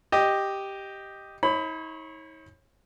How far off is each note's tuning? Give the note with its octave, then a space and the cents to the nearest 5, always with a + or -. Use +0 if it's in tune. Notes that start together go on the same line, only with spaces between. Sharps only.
G4 +0 D#5 +0
D#4 +45 C#5 -30 B5 +15